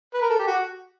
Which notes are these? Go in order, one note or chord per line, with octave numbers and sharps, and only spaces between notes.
B4
A#4
A4
G4
F#4